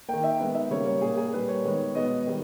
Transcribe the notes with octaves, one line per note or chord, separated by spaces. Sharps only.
D#3 A#3 G5
E5
D#3 G#3 B3
E5
C#3 G3 A#3 C#5
C#5
A#2 A#3 G#4
G#4
A#2 G3 A#3 B4
C#5
D#3 G#3 B3
B2 G#3 B3 D#5
D#3 G3